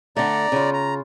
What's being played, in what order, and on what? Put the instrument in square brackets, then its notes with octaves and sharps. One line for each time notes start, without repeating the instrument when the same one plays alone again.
[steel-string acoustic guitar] D3 A3 [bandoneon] D5 A#5
[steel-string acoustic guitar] C#3 F4
[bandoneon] A#5